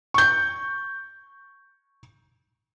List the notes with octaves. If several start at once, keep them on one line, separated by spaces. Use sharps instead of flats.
C#6 G6